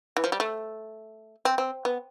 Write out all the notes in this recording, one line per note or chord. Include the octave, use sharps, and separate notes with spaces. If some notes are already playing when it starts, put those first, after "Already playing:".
E3
F3
G3
A3
C4
C4
B3